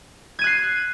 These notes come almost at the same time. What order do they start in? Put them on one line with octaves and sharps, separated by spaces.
G#6 D#7 F#6 C7